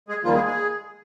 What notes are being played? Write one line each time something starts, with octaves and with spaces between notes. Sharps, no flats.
G#3 G#4
D#2 D#3 F3 G3 A#3 F4
G#3 G#4
G#3 G#4